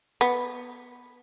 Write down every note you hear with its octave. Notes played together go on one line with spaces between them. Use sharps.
B3